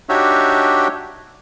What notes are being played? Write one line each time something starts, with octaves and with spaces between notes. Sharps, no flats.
D4 D#4 F#4 G4 C#5 E5